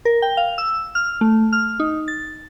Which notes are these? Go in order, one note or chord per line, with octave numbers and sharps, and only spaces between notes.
A#4
G5
F5
E6
F6
A3
F6
D#4
A6